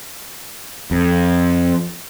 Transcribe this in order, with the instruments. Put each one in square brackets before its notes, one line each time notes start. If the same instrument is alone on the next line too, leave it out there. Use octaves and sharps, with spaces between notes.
[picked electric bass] F2